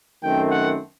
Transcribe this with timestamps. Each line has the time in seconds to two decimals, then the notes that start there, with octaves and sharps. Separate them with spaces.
0.23 F#2 D#3 A3 C4 G5
0.51 F#5